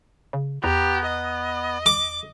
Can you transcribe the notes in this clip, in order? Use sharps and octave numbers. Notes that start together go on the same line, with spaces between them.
C#3
E2 B3 G4 A#5
D#5
D6